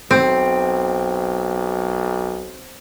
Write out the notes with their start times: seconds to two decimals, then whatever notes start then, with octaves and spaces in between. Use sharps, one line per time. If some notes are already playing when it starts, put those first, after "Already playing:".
0.11 B1 C4